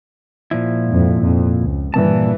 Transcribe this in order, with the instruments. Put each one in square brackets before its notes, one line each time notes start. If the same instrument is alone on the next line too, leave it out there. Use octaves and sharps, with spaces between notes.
[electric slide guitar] A#2 F3 E4
[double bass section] F2 G#2
F2
C#2
[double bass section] G2 E3 [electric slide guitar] A#2 A5